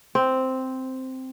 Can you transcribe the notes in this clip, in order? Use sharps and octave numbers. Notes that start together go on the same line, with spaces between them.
C4